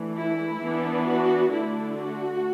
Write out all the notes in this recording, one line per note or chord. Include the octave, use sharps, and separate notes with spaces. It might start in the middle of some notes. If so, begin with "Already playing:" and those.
Already playing: E3 A3 D4
E4
E3 B3 D4
F#4
D3 A3 D4 E4
F#4